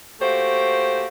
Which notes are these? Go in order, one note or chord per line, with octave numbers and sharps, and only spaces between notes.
A3 A#3 F#4 G4 C5